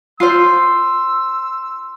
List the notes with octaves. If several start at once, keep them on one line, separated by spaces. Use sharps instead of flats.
F4 C5 C6 E6 C7